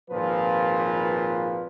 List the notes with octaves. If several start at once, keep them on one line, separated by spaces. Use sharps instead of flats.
G#1 A#2 F3 B4